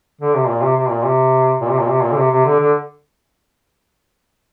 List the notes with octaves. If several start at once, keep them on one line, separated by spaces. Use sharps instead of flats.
D3
C3
A#2
C3
C3
A#2
C3
A#2
C3
A#2
C3
A#2
D3
C3
C3
D3
D3